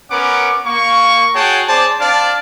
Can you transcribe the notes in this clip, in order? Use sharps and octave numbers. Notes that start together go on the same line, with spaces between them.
B3 C#4 A#4 F#5 D6
A#3 C#6
F#4 G#4 C#5 F#5 G5 A5
C4 G#4 C5 D5 A5
C4 D4 D5 F5 A5